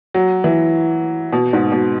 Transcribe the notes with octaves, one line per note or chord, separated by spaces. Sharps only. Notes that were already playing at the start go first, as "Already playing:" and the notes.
F#3
E3
B2
G#2
B2